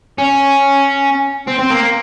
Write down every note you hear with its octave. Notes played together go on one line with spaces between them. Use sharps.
C#4
C4
C4
A#3